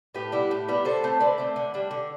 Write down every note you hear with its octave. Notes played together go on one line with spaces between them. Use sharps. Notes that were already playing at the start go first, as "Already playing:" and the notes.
A2 G4 B4
G3 B3 E4
A2
G3 B3 E4
D3 A4 C5
A3 C4
D3 B4 D5
A3 C4
D3
G3 D4
D3